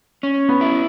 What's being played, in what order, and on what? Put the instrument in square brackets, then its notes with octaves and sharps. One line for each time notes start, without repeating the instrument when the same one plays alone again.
[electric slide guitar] C#4
[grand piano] B3
[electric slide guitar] E4